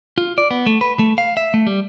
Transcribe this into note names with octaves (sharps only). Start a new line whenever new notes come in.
F4
D5
B3
A3
B4
A3
F5
E5
A3
G3